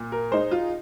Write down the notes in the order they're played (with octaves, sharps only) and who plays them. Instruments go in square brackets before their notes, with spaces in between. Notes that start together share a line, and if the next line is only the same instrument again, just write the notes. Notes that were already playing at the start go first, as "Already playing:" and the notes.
Already playing: [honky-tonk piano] A#2
[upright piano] A#4
[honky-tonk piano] G#3 D#4 [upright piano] C5
[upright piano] F4